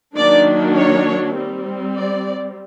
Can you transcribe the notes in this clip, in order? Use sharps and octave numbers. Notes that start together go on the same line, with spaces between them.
D#3 F#3 A#3 D4 D5
C#5
G3 C4
D5